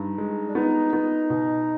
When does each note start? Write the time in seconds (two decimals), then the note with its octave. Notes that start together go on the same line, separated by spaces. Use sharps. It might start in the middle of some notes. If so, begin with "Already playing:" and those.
Already playing: G2 D#4
0.18 G#3
0.46 D4
0.55 B3 D#4
0.93 B3
1.30 B2